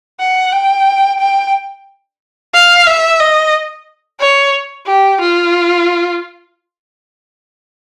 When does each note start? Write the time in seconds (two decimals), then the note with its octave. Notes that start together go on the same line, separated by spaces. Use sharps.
0.20 F#5
0.52 G5
1.19 G5
2.54 F5
2.87 E5
3.20 D#5
4.20 C#5
4.86 G4
5.21 F4